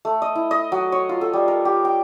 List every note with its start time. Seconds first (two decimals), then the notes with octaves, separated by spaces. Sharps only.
0.05 A3
0.22 D#5
0.35 E4
0.51 D#5
0.72 F#3
0.92 C#5
1.09 F4
1.21 A4
1.33 G3
1.48 A#4
1.65 G4
1.85 G5